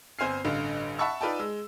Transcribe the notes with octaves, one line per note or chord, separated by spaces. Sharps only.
G1 C4 C5 G#5 F6 C7
A1 G2 D3
E5 F#5 A5 B5 C#6 E6
D#4 F4 B4 D5 G5 A5
G#3 E6